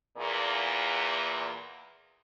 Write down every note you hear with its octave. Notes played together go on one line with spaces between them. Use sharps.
E2 A#2